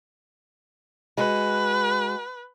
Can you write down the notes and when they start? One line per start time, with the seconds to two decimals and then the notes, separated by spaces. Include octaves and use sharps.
1.18 G#3 F#4 B4